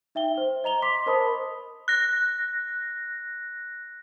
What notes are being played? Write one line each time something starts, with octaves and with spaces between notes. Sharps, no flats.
D#4 E5 G5 G7
C5
D#5 A#5 F7 G7
C6 D6 B6
A#4 C5 D#5 A5 B5 D#6
F#6 A#6